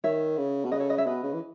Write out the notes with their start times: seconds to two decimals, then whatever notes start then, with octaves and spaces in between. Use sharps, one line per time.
0.04 D#3 C#5 E5
0.38 C#3
0.65 B2
0.72 C#3 B4 D#5
0.80 A4 C#5
0.89 B4 D#5
0.98 C#5 E5
1.07 B2 B4 D#5
1.23 C#3
1.33 E3